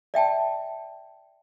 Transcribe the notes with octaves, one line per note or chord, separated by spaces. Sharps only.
D5 E5 G5 A5